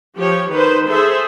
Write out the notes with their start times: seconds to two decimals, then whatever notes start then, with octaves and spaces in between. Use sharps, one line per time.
0.16 F3 G4 C#5
0.50 D#3 B4 C5
0.89 G#4 A4 C5 E5